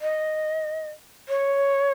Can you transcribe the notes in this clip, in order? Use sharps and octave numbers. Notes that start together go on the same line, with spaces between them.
D#5
C#5